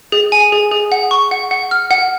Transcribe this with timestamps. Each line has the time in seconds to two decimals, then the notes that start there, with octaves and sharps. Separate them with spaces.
0.12 G#4
0.32 G#5
0.52 G#4
0.72 G#4
0.92 F#5
1.11 C#6
1.31 F#5
1.51 F#5
1.71 F6
1.91 F#5